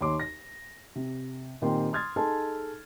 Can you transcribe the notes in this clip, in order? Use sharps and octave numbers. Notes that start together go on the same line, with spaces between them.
D#2 C#5 C6 D6
A#6
C3
A#2 D#3 C4 G4 C6
C6 D#6 F6 G#6 A6
D#4 G#4 A4 G#5 A5 C6